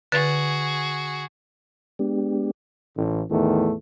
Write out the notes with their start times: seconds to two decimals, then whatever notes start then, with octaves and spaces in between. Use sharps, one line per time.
0.12 D3 F#4 G#4 B4 A6
1.99 G#3 B3 D4 G4
2.97 A1
3.31 E2 A2 D#3 A3